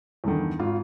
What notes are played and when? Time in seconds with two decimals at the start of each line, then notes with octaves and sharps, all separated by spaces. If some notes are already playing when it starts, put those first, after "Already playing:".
0.24 E2 G2 D3 D#3
0.59 G#1 F4